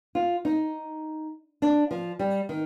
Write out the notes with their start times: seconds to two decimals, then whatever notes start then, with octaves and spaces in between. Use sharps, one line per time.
0.15 F4
0.45 D#4
1.62 D4
1.91 F3
2.19 G3
2.49 D#3